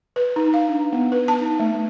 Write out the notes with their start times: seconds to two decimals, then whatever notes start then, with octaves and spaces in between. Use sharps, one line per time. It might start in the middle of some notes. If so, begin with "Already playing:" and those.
0.16 B4
0.36 D#4
0.54 F5
0.69 D4
0.92 B3
1.12 B4
1.28 A5
1.41 D#4
1.60 A3